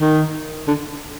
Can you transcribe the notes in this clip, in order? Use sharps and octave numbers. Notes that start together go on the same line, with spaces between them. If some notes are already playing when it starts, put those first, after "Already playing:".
D#3
D3